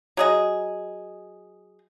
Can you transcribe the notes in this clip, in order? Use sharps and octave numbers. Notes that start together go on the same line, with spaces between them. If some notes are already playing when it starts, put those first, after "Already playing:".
F#3 G#4 D#5